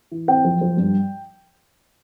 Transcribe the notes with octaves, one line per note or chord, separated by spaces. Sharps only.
E3
C4 G5
F3
F3
G2